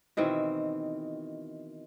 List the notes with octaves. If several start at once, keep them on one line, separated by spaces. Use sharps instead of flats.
B2 D#3 E3 C4